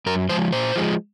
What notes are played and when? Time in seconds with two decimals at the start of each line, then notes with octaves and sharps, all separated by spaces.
0.06 F#2 A#4
0.29 F3 G#3 C5
0.52 A#2 C5
0.76 F3 G#3